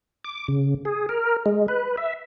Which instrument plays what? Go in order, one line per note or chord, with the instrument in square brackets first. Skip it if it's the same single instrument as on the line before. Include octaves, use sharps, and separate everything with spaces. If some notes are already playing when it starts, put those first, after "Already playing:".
[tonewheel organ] D6
C#3
G#4
A#4
G#3
B4
E5